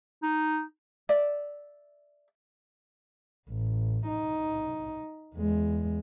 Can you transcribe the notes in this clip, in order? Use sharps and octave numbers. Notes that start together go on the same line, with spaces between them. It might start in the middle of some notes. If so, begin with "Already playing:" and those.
D#4
D5 E5
A1
D#4
E2 G#3